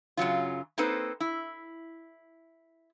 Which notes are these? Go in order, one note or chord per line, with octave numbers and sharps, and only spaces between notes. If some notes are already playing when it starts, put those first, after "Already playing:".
F#2 C#3 F#3 F4
A#3 C4 D#4 A4 B4 C5
E4